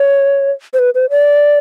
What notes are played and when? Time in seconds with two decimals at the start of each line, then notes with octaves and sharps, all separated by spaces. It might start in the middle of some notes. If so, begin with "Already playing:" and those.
Already playing: C#5
0.73 C5
0.79 B4
0.95 C5
1.10 D5